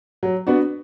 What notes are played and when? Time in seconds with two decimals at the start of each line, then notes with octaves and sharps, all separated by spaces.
0.23 F#3
0.47 B3 D4 F#4